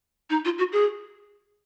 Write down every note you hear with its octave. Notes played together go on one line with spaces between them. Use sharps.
D#4
F4
F#4
G#4